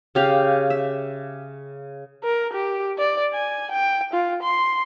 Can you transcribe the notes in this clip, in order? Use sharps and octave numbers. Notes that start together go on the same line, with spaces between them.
C#3 G4 F5
E5
A#4
G4
D5
G#5
G5
F4
C6